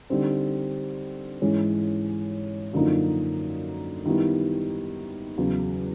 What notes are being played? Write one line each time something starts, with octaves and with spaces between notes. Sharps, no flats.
D3 G3 C4 D#4
G#2 E3 G#3 C#4
F#2 D3 F3 A#3 D#4
D#3 G3 B3 E4
E2 C#3 F#3